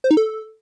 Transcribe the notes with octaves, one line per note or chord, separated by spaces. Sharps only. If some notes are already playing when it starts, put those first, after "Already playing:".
C5
D#4
A4